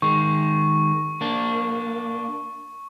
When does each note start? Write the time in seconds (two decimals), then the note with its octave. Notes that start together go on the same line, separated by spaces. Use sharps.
0.02 D#3 G#3 C#6
1.21 A#3 D4